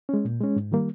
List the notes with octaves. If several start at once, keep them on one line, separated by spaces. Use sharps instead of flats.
G#3 C#4
A#2
G#3 C#4
G#2
D#3 G3 A#3